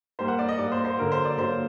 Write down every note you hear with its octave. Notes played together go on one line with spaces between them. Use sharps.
A#2 G3 A#3 C5
F#5
D5
D#5
A#2 G3 A#3 D5
C5
C5
D3 F#3 A#3 A#4
C5
D5
D3 F#3 A#3 C5